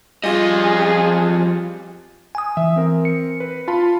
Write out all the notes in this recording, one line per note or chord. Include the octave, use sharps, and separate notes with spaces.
F2 G3 F4 G#4 D#5
G#5 D#6
E3 E5
C4 A#4
C#7
B4
F4 A5 B5